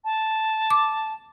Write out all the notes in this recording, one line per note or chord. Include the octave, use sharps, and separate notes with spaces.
A5
D6